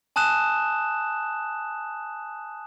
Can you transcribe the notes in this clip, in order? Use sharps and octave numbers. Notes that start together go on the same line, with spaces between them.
G#5 A5 D#6 F#6 E7